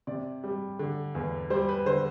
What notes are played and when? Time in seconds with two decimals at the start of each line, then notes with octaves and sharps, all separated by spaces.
0.07 C3 D5
0.44 G3
0.79 D3
1.15 E2
1.50 G3 C5
1.69 B4
1.86 D3 C5